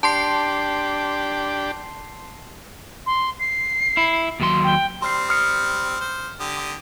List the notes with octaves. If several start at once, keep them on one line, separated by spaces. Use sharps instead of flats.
D4 G4 A5 C6 C7
C6
C7
E4
D#2 F#3 C6
G5
G3 C4 C6 F6 C7
D#6 F6 C#7
C5
D3 G4 D#6